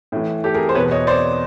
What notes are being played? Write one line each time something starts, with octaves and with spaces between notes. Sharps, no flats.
A2 E3
G4 A4
G#4 A#4
C5
E2 B2 B4 C#5
C#5 D#5
C5 D5